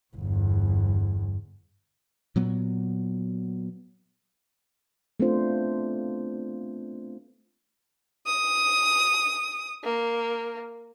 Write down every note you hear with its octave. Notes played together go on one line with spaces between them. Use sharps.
G1 E2
A#2 F#3 B3
A3 B3 C4 D4 F4 C5
D#6
A#3